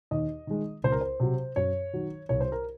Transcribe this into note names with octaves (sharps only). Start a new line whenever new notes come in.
D#2 D#5
D#3 G#3
C#2 C5
A#4
C5
C3 F#3
F#2 C#5
D#3 F#3
C2 C#5
C5
A#4